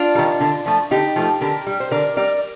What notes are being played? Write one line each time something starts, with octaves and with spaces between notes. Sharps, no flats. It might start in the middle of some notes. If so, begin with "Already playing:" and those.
Already playing: D4 F4
D#3 G3
D3
F3 A3
D3 D#4 G4
F3 A3
D3 G4 A#4
G3
C5
D3 A#4 D5
G3 A#4 D5